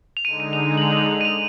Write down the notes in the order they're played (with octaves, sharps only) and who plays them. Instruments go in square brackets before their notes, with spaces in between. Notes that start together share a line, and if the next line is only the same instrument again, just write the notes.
[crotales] F7
[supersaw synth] D3 G#3 D#4 [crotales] D#7
[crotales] D#7
F7
F#7
F7
F#7
F7
F7
D#7
F7